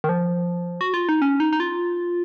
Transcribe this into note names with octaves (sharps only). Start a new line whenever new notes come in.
D#3
F3
F#4
F4
D#4
C#4
D#4
D#4
F4